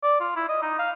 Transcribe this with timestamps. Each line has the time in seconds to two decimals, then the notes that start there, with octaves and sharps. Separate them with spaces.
0.03 D5
0.20 F4
0.36 E4
0.49 D#5
0.62 D#4
0.79 F5